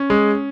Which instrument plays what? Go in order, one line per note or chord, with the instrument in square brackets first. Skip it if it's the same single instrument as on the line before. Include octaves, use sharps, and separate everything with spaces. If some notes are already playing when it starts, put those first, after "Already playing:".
Already playing: [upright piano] C#4
[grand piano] G#3